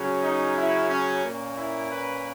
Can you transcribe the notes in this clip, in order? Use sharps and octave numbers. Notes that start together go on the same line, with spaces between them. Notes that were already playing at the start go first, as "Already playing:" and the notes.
Already playing: C#3 F#3 C#4
D#4
E4
C#4
A#2 A#3 C#4
E4
B4